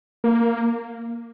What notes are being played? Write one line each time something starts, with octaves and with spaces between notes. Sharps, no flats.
A#3